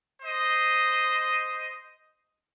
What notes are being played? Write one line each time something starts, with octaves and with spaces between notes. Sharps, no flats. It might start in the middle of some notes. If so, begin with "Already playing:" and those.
C5 D#5